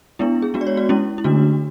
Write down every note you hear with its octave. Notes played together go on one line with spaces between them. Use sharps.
G#3 B3 D4 E4
G#4
G#3 B3 D4 F#4
D5
C#5
F#4
G#3 C#4 E4
E4
D3 A3 D4 F#4